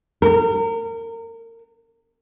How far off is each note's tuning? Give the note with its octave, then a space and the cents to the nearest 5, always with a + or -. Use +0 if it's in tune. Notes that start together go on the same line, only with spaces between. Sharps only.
A#4 -30